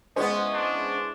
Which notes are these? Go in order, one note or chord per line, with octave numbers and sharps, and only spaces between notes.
G#3 B3 C#4 E4 C5 D#5
D4